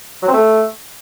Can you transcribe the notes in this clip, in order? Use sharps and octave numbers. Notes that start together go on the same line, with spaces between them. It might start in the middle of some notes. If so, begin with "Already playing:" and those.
F#3
C4
A3